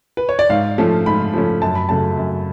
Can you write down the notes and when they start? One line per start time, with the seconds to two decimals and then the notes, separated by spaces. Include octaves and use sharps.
0.17 B4
0.29 C#5
0.39 D5
0.50 G#2 F5
0.78 F3 A3 C#4
1.06 G#2 B5
1.34 F3 A3 C#4
1.62 F#2 A5
1.75 B5
1.89 C#3 F#3 A3 A5
2.17 F#2